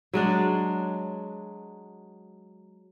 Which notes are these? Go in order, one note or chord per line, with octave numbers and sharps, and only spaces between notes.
F#3 G#3 D4